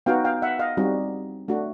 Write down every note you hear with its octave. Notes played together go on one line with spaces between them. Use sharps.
B3 D#4 F#4 F5 G5
F5 G5
E5 F#5
D#5 F5
G3 C4 D#4 F#4
A3 D4 F#4